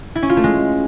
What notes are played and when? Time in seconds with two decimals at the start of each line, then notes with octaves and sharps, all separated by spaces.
0.15 E4
0.22 C#4
0.30 F4
0.37 A3
0.44 G#3